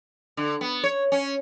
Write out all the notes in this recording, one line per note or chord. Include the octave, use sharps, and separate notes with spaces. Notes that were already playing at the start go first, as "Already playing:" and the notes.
D3
B3
C#5
C#4